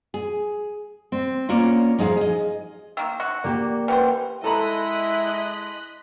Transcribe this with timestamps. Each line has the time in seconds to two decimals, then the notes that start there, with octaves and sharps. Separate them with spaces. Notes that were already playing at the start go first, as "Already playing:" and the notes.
0.14 G#4
1.12 C4
1.49 A#3 C#4 F4 C#5 D5
1.98 F3 D#4 G#4 D#5 F5
2.17 G#4 D#5
2.97 D#3 A#3 E6
3.20 F#4
3.44 A#3 G4 D5
3.88 C#3 E3 B4 C5 F#5 G5
4.44 G#3 E4 A4 D#5 A#5 B5 F#6 B6